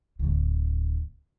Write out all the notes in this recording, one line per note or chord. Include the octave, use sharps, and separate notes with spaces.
D1 D2